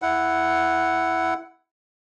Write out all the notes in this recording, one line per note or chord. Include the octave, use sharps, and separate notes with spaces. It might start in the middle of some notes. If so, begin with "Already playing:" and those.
E4 F#5